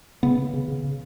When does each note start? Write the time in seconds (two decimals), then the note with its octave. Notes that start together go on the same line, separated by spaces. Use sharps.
0.23 C#3 B3
0.38 C#3
0.54 C#3
0.68 C#3
0.84 C#3